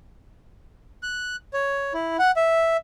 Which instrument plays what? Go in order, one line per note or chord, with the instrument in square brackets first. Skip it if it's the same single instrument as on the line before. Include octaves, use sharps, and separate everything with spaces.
[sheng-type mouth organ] F#6
C#5
E4
F#5
E5